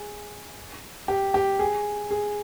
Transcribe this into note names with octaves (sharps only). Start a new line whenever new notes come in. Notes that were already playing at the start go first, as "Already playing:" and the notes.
Already playing: G#4
G4
G4
G#4
G#4